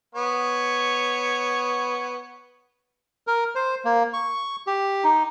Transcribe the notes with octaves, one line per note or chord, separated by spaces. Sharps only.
B3 C#5
A#4
C5
A#3
C#6
G4
D#4